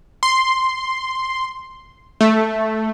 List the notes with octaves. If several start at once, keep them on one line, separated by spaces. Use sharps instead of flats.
C6
A3